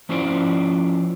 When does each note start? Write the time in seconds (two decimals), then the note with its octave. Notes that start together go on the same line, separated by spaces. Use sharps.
0.09 F3 C#4 E4 F4 C5 D5